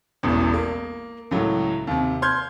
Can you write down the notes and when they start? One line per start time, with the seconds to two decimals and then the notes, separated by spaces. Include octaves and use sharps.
0.23 E1 A1 E2
0.54 A#3
1.31 C#2 A2 F#3
1.87 D#2 C3
2.22 C6 F6 G6 G#6